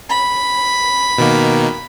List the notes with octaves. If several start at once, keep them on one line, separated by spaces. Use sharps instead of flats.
B5
B2 D#3 A#3